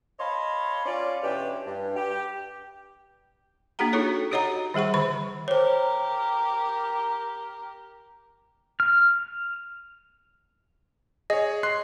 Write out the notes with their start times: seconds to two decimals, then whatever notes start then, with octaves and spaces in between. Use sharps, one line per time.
0.20 C#5 D#5 F5 A5 B5 C6
0.86 C#4 F4 D5
1.23 B2 E3 C#4 D4 G4
1.66 G2
1.96 G4
3.79 A#3 D4 F#4 G#4 F#5 A#5
3.93 D#4 F4 F#4 A4 C#5
4.31 F#4 G4 C#5 D#5 F#5 A#5
4.74 D#3 G3 G#4 F#5 C#6
4.94 D3 D#3 B5 C#6
5.48 G4 A#4 C5 C#5
8.80 F6
11.30 G#4 C#5 D#5
11.63 C6 F#6 C7